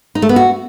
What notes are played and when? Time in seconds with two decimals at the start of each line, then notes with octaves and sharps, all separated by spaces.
0.15 D#4
0.22 A3
0.29 B3
0.36 F#4